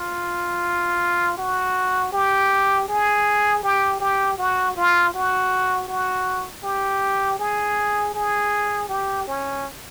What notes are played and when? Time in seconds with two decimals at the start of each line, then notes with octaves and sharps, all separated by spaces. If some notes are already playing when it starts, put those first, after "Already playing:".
Already playing: F4
1.38 F#4
2.13 G4
2.88 G#4
3.63 G4
4.00 G4
4.38 F#4
4.77 F4
5.14 F#4
5.88 F#4
6.64 G4
7.39 G#4
8.15 G#4
8.89 G4
9.27 C#4